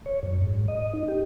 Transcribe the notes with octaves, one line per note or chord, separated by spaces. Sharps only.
C#5
F#2
G#2
D#5
D#4
G4